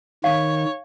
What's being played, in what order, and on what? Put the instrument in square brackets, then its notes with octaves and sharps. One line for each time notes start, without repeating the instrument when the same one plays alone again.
[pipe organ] D#3 [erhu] C#5 [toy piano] F5